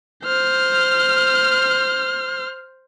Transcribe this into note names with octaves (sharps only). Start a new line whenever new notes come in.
C5 F6